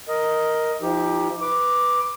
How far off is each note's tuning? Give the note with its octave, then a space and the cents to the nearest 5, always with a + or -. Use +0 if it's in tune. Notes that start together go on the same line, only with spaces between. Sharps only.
A#4 +0 D#5 +10
F3 -20 D#4 +25 G4 +10
B4 +0 D6 +0